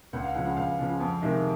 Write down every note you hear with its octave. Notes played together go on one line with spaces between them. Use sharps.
C#2 F#5
F5
C#3 F3 G#3 F#5
F#5
C#2 F5
C#3 F3 G#3
F2
C3 D#3 G#3